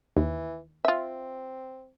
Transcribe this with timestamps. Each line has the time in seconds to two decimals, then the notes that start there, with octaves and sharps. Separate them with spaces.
0.17 D#2 E3
0.85 C4 F4 E5